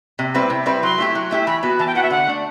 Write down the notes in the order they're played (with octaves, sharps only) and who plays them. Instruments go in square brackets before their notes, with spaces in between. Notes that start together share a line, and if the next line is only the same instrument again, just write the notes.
[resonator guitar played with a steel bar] C3
G3 C4 E4 B4
C3
G3 C4 E4 B4
[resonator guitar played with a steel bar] F#3 [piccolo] C6
[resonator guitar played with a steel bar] A3 E4 G4
F#3
A3 E4 G4
[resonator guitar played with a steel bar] E3 [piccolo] B5
[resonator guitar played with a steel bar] B3 F#4
[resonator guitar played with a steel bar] E3 [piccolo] A5
[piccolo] G5
[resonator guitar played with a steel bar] B3 F#4 [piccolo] F#5
[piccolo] E5
[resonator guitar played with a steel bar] D3 [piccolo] F#5
[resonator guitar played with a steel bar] A3 D4